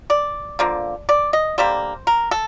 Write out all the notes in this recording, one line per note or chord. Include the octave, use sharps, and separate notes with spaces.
D5
D3 F3 A#3
D5
D#5
D3 G3 A#3 C5
A#4
A4